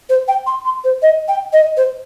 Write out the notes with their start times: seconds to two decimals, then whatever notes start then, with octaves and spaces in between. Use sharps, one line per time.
0.09 C5
0.28 G5
0.46 C6
0.65 C6
0.84 C5
1.02 D#5
1.28 G5
1.52 D#5
1.76 C5